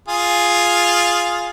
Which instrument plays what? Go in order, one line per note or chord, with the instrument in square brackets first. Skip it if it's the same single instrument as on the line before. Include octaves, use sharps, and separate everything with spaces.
[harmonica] F4 G#4